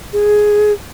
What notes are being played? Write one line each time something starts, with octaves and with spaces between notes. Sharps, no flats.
G#4